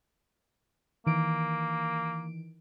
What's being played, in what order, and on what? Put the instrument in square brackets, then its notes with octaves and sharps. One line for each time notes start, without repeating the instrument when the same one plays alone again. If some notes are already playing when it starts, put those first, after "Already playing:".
[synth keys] D#3 E3 D7 [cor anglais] A#3